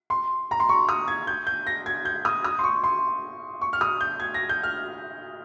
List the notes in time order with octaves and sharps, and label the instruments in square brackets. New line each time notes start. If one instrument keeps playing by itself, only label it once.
[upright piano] C6
A#5
C6
C#6
D#6
G#6
G6
G6
A#6
G#6
G6
D#6
D#6
C6
C#6
C6
C#6
F6
D#6
G6
G#6
A#6
G6
F6